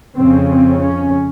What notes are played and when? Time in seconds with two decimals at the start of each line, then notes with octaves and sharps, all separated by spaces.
0.18 F2 C#3 C4
0.51 C4
0.82 C#4